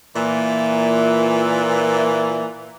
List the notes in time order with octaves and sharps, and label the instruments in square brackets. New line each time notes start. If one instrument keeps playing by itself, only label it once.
[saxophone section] A#2 E3